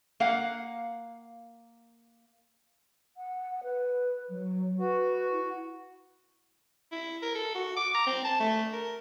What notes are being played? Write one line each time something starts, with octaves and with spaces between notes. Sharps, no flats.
A#3 F5 F#5
F#5
B4
F#3
F#4 B4
E4
E4
A#4
A4
F#4
D6
A#5
C4
A5
A3
A#4